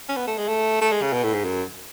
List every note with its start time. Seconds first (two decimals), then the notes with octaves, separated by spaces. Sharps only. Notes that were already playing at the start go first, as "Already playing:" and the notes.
0.09 C#4
0.17 B3
0.27 A3
0.38 G#3
0.48 A3
0.82 A3
0.92 G#3
1.02 C#3
1.13 B2
1.24 A2
1.34 G#2
1.45 F#2